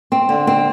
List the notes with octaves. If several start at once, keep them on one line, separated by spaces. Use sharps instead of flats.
C4
D3
C4